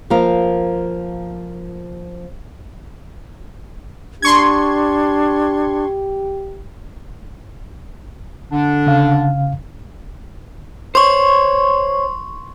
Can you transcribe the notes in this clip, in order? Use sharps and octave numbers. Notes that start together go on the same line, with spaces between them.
F3 A#3 F4 A#4
D4 G4 C6 C#6 G#6
D3 D4
C#3 F5
C5 C#5 C6 C#6